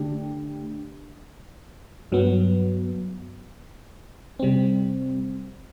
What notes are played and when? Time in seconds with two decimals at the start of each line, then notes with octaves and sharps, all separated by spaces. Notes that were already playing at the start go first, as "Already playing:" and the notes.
Already playing: D3 A3 D4 G4
2.12 G2 F#3 B3
4.39 C3 G3 C4